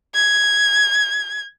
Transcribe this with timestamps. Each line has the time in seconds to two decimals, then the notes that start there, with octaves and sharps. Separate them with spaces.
0.15 G#6